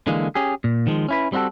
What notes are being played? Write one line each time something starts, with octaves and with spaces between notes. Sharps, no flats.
D3 E3 G#3 A#3
C#4 G4 G#4
A#2
D#3 F3 G#3
C#4 E4 B4
G3 C4 D#4 F#4 A4